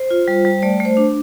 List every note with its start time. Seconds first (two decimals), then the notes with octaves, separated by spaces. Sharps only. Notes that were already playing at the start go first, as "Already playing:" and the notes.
Already playing: C5
0.10 F4
0.28 G3
0.45 G3
0.62 A3 D5
0.80 A3
0.85 C5
0.97 D4